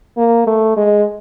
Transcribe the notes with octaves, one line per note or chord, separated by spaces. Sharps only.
A#3
A3
G#3